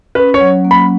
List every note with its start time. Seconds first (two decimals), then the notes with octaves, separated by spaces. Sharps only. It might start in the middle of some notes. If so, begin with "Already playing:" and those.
0.15 C#4 B4
0.34 C#5
0.41 F#3
0.65 A#3
0.71 B5